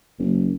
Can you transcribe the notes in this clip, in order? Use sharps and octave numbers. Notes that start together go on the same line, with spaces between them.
F#1